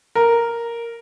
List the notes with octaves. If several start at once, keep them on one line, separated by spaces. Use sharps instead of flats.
A#4